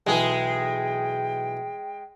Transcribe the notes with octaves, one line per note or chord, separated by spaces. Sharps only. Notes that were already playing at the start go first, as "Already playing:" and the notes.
B1 E3 G#3 G#4 G5